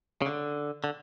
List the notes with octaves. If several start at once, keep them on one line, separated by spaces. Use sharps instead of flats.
C#3
D3
D3